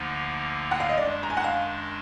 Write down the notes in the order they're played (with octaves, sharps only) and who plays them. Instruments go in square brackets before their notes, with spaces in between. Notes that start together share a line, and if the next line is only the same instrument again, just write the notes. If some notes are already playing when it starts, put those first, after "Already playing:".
Already playing: [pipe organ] D2 D3 F3 A#3 D#4
[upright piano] F#5
F5
D#5
[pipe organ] F#2 D#3 G#3 D4 [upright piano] D5
[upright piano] A#5
G#5
F#5
F5